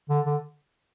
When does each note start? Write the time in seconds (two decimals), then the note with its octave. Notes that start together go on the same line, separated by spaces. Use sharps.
0.09 D3
0.26 D3